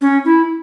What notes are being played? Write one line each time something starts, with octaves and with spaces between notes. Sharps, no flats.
C#4
E4